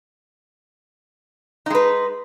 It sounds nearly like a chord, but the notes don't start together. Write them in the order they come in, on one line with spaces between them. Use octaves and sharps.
D#4 G#3 B4